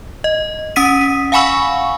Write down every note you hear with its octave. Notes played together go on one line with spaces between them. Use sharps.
D#5
C#4 D#6 B6 D#7
F5 F#5 G#5 B5 C#6 E6